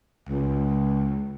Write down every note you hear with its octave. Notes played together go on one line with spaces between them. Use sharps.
C#2